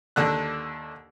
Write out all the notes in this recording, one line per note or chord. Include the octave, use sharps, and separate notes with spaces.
D#2 D3 D4 F#6